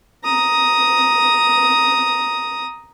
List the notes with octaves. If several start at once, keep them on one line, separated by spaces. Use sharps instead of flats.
A#5 D#6